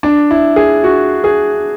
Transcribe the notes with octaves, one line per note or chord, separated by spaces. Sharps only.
D4
E4
G#4
F#4
G#4